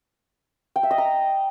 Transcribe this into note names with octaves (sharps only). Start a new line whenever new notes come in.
G5
E5
D#5
A#5